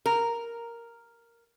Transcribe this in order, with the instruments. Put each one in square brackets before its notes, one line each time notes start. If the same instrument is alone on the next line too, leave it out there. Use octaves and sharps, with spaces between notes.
[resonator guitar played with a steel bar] A#4